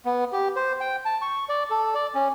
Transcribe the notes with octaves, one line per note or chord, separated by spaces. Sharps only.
B3
G4
C5
G5
A5
C#6
D5
A4
D5
C#4